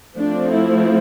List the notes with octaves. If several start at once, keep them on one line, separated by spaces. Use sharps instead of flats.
F3 A3 C4 D4
E4